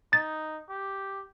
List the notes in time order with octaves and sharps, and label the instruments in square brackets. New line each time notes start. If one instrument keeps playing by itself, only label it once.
[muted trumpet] D#4 [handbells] A6
[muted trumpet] G4